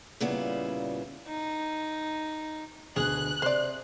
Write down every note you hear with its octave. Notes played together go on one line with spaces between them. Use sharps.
A#2 C#3 G3 B3 E4 F4
D#4
D2 B2 G#4 F#6
C3 C5 D5 C6